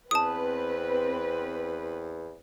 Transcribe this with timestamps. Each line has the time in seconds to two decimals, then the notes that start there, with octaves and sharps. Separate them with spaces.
0.11 E2 C4 B4 A5 D#6